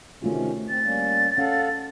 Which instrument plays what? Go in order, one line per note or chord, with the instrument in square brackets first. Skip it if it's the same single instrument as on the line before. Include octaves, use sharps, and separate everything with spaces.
[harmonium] C3 D#3 C#4 [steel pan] A3 F4 F#4
[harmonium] C4 [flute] A6
[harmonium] G3 A#3 C#4
[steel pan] C#4 [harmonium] A4 F5 F#5